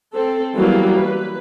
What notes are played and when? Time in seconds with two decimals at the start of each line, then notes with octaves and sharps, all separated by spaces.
0.14 C4 A4
0.55 E3 F#3 G3 A#3 B3
0.98 B4